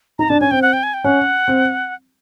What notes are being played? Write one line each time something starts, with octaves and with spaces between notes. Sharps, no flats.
D#4 A#5
D4 A5
C#4 G#5
C4 G5
F#5
G5
G#5
G5
C#4 F#5
C4